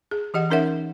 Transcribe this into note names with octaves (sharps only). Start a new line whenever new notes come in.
G#4
E3 G4 D#5 F#5
C#4 D#4 A#4 C#5 E5 F#5